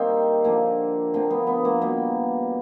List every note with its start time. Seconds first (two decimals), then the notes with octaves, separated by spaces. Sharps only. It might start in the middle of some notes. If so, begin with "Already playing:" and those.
Already playing: D#3 G3 A#3 C4 D#4
0.44 D3 F3 A#3
1.14 D3 F3 A#3 C4
1.30 B3
1.47 B3
1.65 A#3
1.81 B2 G3 A#3 B3